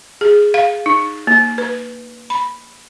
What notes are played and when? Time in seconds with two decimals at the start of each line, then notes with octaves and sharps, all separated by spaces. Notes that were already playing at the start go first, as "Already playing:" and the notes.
0.21 G#4
0.54 F5
0.86 D#4
1.27 A#3
1.58 B4
2.30 B5